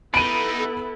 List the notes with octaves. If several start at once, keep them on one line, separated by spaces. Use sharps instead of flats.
G3 B3 D#4 E4 A4 B5 D7 D#7